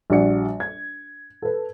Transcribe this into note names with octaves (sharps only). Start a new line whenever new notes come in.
A#1 G3 F#4 D5 F#5 C#7
G#6
A4 B4